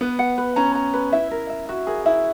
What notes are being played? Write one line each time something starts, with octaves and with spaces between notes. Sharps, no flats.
B3 B4
F#5
B4
C#4 A#5
A#5
B4
E4 E5
A#4
E5
F#4 E5
G#4 A#4
E4 E5